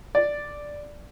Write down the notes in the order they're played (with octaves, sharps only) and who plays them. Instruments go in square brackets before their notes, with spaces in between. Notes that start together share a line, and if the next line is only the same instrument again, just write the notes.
[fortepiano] D5